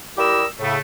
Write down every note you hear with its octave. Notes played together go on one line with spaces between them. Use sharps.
G3 E4 G4 A#4 D#5 E6
A2 C#3 A3